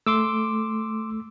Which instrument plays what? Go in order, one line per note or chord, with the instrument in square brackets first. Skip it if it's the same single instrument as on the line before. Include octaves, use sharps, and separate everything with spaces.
[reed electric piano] A3 [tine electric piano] C6 D6 E6